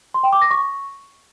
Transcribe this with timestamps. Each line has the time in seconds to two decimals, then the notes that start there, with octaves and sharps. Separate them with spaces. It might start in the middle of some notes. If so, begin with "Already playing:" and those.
0.14 C6
0.23 G5
0.33 D6
0.42 A#6
0.51 C#6